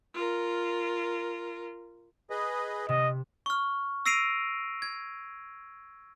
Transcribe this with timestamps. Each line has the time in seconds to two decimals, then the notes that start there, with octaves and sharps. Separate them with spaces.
0.14 F4 A#4
2.30 G#4 B4 D#5
2.89 C3 D#5
3.46 C#6 F6
4.06 E6 A#6 C7 D7 D#7 F7
4.82 G#6